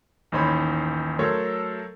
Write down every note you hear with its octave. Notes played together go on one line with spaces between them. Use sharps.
A1 D#2 D#4 C5 C#5 B5
F#3 A3 A4 A#4 C5 C#5